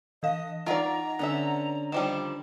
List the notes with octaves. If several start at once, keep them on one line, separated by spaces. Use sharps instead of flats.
E3 D#5 F5
D#4 F4 A#4 D5 D#5 F#5 A#5
D3 B3 C#4 E5
D#3 F3 G3 G5 D6 E7